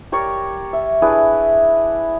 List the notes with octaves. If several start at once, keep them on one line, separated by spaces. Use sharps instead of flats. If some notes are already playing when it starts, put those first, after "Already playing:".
G4 A#4 C#5 D5
E5
D4 E4 G#4 B4